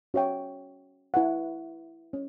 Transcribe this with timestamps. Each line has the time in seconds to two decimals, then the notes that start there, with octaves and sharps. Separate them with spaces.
0.14 C#4 F#4 C#5 E5 G5
1.14 E4 B4 F#5
2.13 C#4